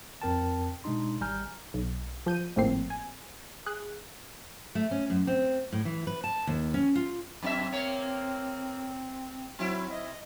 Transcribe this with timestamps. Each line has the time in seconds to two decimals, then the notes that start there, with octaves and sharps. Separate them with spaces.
0.22 F2 C4 A#4 G5 A5
0.84 B2 G#3 D4 D#4 C6
1.21 G#1 G3 G#5 A#5 F6 G6
1.74 B1
2.26 F3 G6 D#7
2.56 G#1 A2 F3 A#3 C4 C7
2.90 G#5
3.66 G#4 F#6
4.75 A3
4.91 C#4
5.10 F#2
5.27 C4
5.72 A2
5.85 E3
6.07 B4
6.24 A5
6.47 D#2
6.74 C#4
6.95 F4
7.42 F#2 C4 D5 E5
7.72 A#3 C#5
9.59 F#3 C4 E4
9.91 D#5